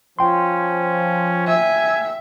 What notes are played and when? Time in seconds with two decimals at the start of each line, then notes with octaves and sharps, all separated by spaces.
0.19 F3 C#4 G5 C6
1.47 E5 G#5